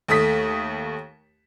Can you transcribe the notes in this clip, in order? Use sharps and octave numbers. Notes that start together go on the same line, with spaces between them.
D#2 A3 D#6 B6